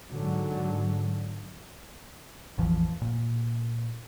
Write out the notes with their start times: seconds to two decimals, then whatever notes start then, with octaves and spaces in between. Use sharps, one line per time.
0.10 G#2 D3 F#3
2.58 A1 E2 E3 F3
3.02 A#2